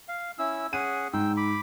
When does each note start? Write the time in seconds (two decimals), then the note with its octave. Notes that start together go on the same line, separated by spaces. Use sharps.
0.08 F5
0.39 C#4 E4 E6
0.73 C#4 G#4 F#5 D#7
1.13 G#2 G5 E6
1.37 B5 D6